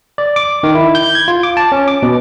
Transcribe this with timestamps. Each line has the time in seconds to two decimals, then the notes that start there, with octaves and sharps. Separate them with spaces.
0.18 D5
0.36 D6
0.63 D#3
0.75 E4
0.95 G6
1.15 G#6
1.28 F4
1.43 D6
1.57 A5
1.72 C#4
1.88 D6
2.03 B2